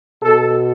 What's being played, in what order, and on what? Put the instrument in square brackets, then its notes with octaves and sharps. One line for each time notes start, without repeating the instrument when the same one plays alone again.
[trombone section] B2 A4